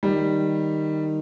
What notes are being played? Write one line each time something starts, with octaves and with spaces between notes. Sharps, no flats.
D#3 G3